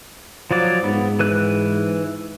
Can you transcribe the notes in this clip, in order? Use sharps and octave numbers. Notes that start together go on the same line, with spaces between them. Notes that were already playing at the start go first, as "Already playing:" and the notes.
F3 F#3 D5
G#2 B3
E3 B4 F#6